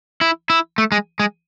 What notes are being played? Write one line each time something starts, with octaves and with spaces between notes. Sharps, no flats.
E4
E4
A3
G#3
G#3